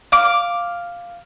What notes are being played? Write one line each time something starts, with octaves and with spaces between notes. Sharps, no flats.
F5 D6